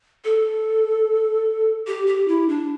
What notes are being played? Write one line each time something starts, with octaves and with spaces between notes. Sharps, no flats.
A4
G4
G4
E4
D4